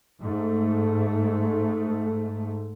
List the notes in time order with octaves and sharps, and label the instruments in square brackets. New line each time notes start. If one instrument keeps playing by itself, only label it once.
[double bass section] G#2 A3